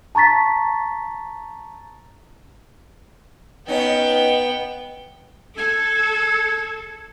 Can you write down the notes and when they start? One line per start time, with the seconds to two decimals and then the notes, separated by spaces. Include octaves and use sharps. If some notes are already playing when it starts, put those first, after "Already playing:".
0.15 A5 A#5 C#6 A6 B6
3.68 B3 C#4 D#4 G5
5.58 A4 G#6